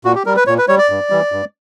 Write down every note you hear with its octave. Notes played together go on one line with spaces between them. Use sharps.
A#2 F#4
G4
G3 A#4
B4
A#2 C#5
B4
G3 C#5
D5
G2
E3 G3
G2